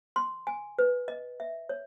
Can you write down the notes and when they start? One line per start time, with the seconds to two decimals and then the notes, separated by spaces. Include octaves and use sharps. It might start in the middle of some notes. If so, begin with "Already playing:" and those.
0.16 C6
0.47 G#5
0.79 B4
1.08 D#5
1.40 E5
1.69 C#5